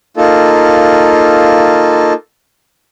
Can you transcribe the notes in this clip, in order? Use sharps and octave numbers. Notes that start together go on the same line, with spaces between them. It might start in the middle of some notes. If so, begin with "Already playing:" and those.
A#3 D#4 F4 A4